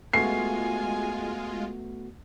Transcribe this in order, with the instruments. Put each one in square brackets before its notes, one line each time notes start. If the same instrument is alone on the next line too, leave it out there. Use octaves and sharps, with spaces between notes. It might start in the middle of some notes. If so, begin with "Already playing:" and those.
[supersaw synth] G#3 F4 [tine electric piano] A3 B3 F#4 [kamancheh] G#5 [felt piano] C7